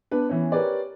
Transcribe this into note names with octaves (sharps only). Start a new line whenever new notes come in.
B3 D4 B4
E3 B3 C#4
G4 A#4 B4 C#5 D5